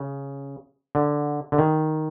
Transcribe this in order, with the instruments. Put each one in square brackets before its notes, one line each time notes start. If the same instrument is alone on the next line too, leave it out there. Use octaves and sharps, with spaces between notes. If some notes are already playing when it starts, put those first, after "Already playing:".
Already playing: [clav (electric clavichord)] C#3
D3
D3
D#3